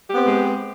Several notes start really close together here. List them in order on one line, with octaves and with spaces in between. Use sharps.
G4 B3 C4 B4 G#3